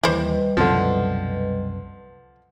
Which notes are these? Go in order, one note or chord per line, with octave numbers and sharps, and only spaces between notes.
D#2 E3 G3 E4 B4 C5 D#5
C2 F#2 B2 D3 F3